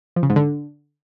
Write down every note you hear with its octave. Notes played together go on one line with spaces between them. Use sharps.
F3
C#3
G#2
D3